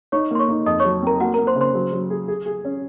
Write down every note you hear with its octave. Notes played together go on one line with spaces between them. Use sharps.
D#4 C#5 C#6
A#3 C6
C#5 C#6
D#4
F2 D#5 D#6
C#5 C#6
F#3
C4 A#4 A#5
A#3 F#4 F#5
A#4 A#5
A#3
C5 C6
C#3
C5 C6
F#3
F#3
G#4
G#4
G#4
C#4